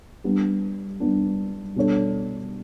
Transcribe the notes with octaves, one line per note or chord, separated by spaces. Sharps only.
G3 B3 D4
G3 B3 D4
B2 G3 D4 A4 C#5